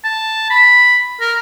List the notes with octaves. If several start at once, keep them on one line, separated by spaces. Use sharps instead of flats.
A5
B5
A#4